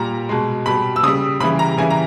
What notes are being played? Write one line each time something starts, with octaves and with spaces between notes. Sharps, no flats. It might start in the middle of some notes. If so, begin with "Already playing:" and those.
Already playing: A#2 G3 A#5
B2 G#3
B2 G3 B5
E6
C#3 G3 D#6
C#3 E3 G3 B5
A#5
C#3 E3 G3 G#5
A#5